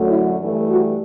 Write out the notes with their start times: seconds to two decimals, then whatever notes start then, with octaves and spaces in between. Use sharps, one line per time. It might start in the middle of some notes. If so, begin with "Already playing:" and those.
Already playing: F#2 D3 F#3 A3
0.08 E4
0.38 G2 E3 A3
0.68 F#4